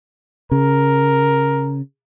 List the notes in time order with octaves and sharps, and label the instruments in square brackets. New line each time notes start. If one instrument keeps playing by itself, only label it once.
[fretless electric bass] C#3 [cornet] A#4